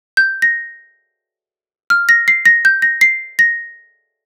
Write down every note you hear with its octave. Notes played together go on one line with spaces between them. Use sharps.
G6
A#6
F6
A#6
C7
A#6
G6
A#6
C7
A#6